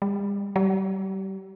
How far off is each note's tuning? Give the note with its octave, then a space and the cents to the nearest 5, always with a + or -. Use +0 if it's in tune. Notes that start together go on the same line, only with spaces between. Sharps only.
G3 +45
G3 -30